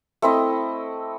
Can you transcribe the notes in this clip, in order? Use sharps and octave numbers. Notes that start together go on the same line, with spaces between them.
A3 C4 E4 D#5